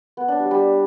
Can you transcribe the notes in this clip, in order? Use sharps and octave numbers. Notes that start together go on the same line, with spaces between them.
B3
D4
G3
G3